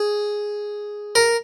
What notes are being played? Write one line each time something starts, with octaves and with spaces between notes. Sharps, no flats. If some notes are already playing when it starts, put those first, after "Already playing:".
Already playing: G#4
A#4